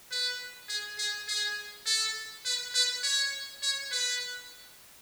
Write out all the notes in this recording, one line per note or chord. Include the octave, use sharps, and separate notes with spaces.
B4
G#4
G#4
G#4
A4
B4
B4
C#5
C#5
B4